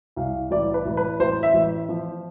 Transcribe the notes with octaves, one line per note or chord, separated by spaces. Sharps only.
C2 F5
A1 D5
B4
A1
B4
A1 C5
E5
A1
F3